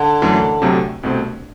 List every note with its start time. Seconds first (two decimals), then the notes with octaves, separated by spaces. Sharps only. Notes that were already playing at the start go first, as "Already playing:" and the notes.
Already playing: D3
0.22 F#2 E3 A3
0.62 D2 C3 F#3 A3 C4
1.03 C2 B2 A3 C4